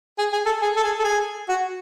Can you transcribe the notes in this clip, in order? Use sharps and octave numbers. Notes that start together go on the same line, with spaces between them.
G#4
G#4
A4
G#4
A4
G#4
A4
G#4
F#4